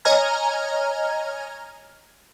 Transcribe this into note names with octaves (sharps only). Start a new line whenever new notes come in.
C#5 D#5 G#5 A#5 F6 G#6